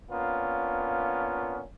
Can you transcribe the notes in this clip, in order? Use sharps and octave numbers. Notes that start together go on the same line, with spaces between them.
A#3 B3 C#4 D4 F4